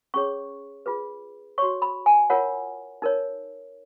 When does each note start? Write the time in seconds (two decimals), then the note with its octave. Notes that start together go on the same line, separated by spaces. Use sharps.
0.14 C#4 G#4 C#5 C#6
0.86 F4 G#4 B4
1.58 F#4 C#5 C#6
1.82 B5
2.06 G#5
2.30 F4 A#4 C#5 F#5
3.02 D#4 A#4 C#5